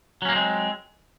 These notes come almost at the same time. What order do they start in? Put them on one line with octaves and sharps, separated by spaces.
F#3 C#4 A#3 C4 G#3